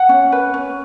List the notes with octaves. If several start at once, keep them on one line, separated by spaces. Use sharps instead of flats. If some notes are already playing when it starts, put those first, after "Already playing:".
Already playing: F#5
C#4
B4
C#4